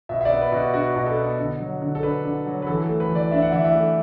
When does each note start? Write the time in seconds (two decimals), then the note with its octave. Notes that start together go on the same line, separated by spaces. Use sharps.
0.09 B2 E5
0.21 E5
0.25 D5
0.31 B3
0.41 B4
0.52 B2
0.57 F#4
0.74 D4 F#4
0.96 B2
1.06 A4
1.17 B3
1.39 D3
1.60 F#3
1.82 D3
1.95 A4
2.03 D4 B4
2.25 D3
2.46 F#3
2.62 B4
2.67 E3 A4
2.83 A4
2.88 A3
3.00 B4
3.10 E3
3.15 D5
3.31 D4 E5
3.42 F#5
3.52 E3 E5
3.64 E5
3.75 A3